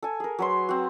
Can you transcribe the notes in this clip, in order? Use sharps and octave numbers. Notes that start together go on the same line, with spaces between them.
A4 G#5
G#4 A#4
F#3 B4 C6
C4 F#4